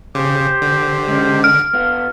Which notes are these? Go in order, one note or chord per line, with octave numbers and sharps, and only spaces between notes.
C#3 G4 C5
D3
G#3 C#4
F6
B3 F4